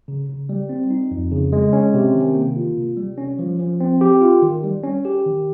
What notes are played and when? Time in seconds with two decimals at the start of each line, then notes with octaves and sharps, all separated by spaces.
0.08 C#3
0.29 C#3
0.49 G3
0.69 C4
0.91 D#4
1.11 F2
1.32 C#3
1.53 G#3
1.73 C#4
1.94 C3
2.14 D#3
2.35 A#3
2.56 F4
2.77 C3
2.97 G3
3.18 C#4
3.39 F3
3.59 F3
3.80 C4
4.01 G4
4.21 F4
4.42 D#3
4.64 G3
4.83 C#4
5.05 G4
5.26 D#3